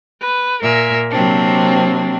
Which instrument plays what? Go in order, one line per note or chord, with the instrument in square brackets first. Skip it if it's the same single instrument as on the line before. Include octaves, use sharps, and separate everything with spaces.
[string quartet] B4
A#2 A#4 E5 G#5
C3 F#3 A#3 C4 D4